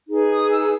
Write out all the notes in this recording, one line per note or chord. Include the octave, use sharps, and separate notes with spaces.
D#4 G#4 B4
D#6
E6